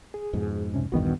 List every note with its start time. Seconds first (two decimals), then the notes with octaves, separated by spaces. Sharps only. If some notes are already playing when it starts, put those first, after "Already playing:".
0.14 G#4
0.33 F2 G#2 B2
0.74 C2 C3 C#4
0.92 A#1 E2 G2 D#3 B3 F#4